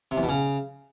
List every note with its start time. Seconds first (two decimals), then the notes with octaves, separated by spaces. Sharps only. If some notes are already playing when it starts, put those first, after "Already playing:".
0.11 C3
0.17 E2
0.23 B2
0.29 C#3